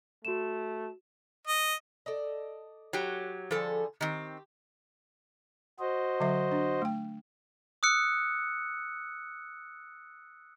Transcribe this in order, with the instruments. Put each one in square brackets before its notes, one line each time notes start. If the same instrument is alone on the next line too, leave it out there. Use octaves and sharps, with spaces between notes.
[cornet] A3 [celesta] F#4 E7
[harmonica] D#5
[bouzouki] A4 D5 D#5
[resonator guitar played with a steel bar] F#3 G4
[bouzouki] D3 G3 G#4 [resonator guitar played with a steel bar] F3 A4
[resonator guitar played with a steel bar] D#3 C4 [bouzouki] G4
[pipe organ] F#4 C5 D#5
[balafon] D3 F#3 E5
D4
A3 G5
[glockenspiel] D#6 E6 F#6 C#7